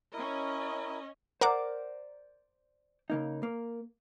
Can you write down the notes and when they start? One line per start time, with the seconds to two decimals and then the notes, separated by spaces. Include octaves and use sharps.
0.14 C#4 E4 A#4 D#5
1.41 A#4 C5 D5 F#5 D6
3.10 C#3 A#3 D#4
3.43 A#3